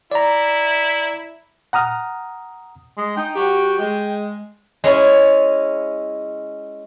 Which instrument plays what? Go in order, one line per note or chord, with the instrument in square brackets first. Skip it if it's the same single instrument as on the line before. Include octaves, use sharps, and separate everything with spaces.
[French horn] E4 [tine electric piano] D5 A#5
[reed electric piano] F#5 A#5 D#6 F6
[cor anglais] G#3
[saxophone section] D#4 [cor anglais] G5
[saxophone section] F#3 F#4 G4
G#3
[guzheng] G#3 C#4 E4